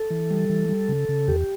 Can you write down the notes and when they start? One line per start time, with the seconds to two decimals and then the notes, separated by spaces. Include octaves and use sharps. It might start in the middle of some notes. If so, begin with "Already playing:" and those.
Already playing: A4
0.10 E3
0.31 G3
0.49 E3
0.69 G3
0.89 C#3
1.09 C#3
1.28 E2 G4